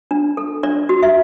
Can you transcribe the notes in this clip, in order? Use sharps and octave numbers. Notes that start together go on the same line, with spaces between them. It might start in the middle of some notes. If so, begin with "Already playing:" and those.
D4
A4
D4 D5
F#4
E5